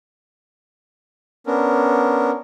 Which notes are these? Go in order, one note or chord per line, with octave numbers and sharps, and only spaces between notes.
B3 C#4 D4 A#4